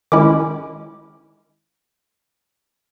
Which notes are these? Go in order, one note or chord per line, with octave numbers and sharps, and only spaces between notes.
D#3 G#3 C#4 E4 D6